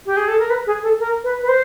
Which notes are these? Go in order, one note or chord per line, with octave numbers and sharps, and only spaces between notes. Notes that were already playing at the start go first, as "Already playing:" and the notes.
G4
G#4
A4
A#4
B4
G#4
A4
A#4
B4
B4
C5